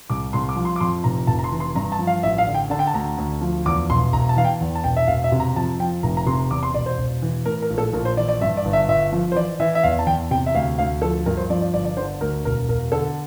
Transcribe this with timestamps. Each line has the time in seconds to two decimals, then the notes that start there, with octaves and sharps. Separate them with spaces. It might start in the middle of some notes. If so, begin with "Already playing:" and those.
0.10 C2 D6
0.33 C2 C6
0.49 D6
0.56 F3
0.65 C6
0.76 D6
0.80 F2 C6
1.04 F1 A#5
1.27 F1 A5
1.39 A#5
1.44 C6
1.52 E3
1.60 C6
1.75 G2 A#5
1.92 A5
1.99 F3
2.07 F5
2.23 A1 E5
2.38 F5
2.47 D3
2.54 G5
2.70 D3 A5
2.79 G5
2.87 A5
2.94 D2 A#5
3.18 D2
3.41 F3
3.66 E2 D6
3.90 E1 C6
4.13 E1 A#5
4.29 A5
4.37 E3 F5
4.45 G5
4.61 E2
4.76 A5
4.84 E1 G5
4.96 E5
5.08 E1 F5
5.24 E5
5.32 C3
5.40 A#5
5.56 F2 A5
5.80 F3 G5
6.03 F1 A#5
6.17 A#5
6.26 C3 C6
6.51 E2 D6
6.63 C6
6.74 E1 D5
6.86 C5
6.98 E1
7.22 E3
7.46 A2 A#4
7.62 A#4
7.70 A#1
7.78 A4
7.93 A#1 A#4
8.05 C5
8.17 E3 D5
8.29 D5
8.41 G2 E5
8.57 D5
8.65 G1
8.73 E5
8.88 G1 E5
9.12 F3
9.32 C5
9.35 E3 D5
9.60 E3 E5
9.75 E5
9.83 E2 F5
9.99 A5
10.07 E2 G5
10.31 C3 G5
10.46 E5
10.54 D2 F5
10.78 D2 F5
11.02 F3 A4
11.26 G2 A#4
11.37 C5
11.50 F3 D5
11.62 D5
11.74 G1 D5
11.85 D5
11.97 D3 C5
12.20 D2 A#4
12.45 E1 A#4
12.68 E1 A#4
12.92 D3 A4